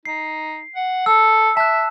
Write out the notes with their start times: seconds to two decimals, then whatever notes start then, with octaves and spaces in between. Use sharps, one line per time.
0.05 D#4 C7
0.76 F#5
1.06 A4 E6
1.57 E5 A5 F#6